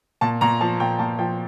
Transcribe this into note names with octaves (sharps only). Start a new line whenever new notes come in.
A#2 A5
A#2 A#5
F3 A5
A#2 G5
A#2 A5
F3 G5